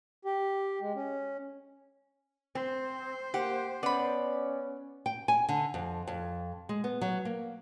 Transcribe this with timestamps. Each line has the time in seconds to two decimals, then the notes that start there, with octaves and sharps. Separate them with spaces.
0.25 G4
0.81 G#3
0.95 C#4
2.55 C4 C5
3.34 A#3 G4 F#5
3.83 B3 C#4 D5 B5
5.06 G5
5.28 G#5
5.49 D3
5.74 F2
6.07 F2
6.69 G#3
6.84 B3
7.01 F#3
7.25 A#3